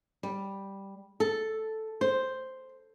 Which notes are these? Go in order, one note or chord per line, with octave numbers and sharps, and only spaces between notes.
G3
A4
C5